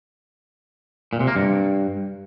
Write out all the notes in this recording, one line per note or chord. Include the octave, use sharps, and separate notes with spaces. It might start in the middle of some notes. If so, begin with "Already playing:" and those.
A#2
C3
A#3
G2